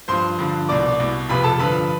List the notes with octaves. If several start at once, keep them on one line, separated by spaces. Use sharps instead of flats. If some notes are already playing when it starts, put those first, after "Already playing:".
G2 F3 C5 C6
G2 D3 F3
C2 B2 D5 D6
C2 B2
F2 C3 F3 B4 B5
A4 A5
G2 D3 F3 B4 B5